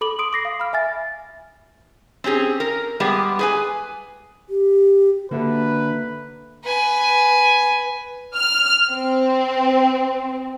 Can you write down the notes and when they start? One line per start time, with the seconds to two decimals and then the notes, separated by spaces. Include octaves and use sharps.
0.01 A4 B5 D6 F#7
0.19 C6 D#6 D7
0.33 D6 A#6 C7
0.45 F5
0.60 B5 F6
0.73 E5 G#5 A6
2.24 C4 C#4 G4 G#4
2.60 A#4
3.00 G3 G#3 B3 G4 G#4
3.39 G#4 B4 G#5
4.50 G4
5.31 D3 A#3 F#4 B4 E5
6.64 B4 G#5
8.35 F6
8.92 C4